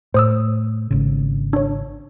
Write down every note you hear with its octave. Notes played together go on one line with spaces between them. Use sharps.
A2 C5 D#6 E6
G#1 C#3
D4 C#5